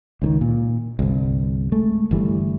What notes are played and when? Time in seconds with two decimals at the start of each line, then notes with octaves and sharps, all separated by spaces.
0.22 C#2 D3 D#3
0.41 A#2
0.99 G1 C2
1.72 G#3 A3
2.11 G1 E3 G3 A3